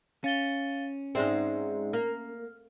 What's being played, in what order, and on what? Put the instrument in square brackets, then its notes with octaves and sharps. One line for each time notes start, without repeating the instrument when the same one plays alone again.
[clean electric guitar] C#4 [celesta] F5 A6 G7
[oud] G#2 G#3 C4 [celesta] D5 E5
[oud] A#3 [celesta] F6